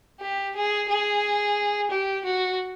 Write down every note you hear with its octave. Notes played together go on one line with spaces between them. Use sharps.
G4
G#4
G#4
G4
F#4